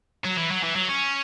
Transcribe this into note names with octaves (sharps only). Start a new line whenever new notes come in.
F#3
E3
F#3
E3
F#3
C#4